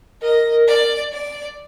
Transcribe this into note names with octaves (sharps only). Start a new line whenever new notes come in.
A#4 D#5
A#4 D5
D5